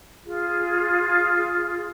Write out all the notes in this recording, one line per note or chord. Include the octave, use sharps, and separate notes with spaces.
F4 G#4